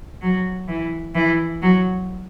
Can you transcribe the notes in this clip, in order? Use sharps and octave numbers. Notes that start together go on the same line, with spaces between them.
F#3
E3
E3
F#3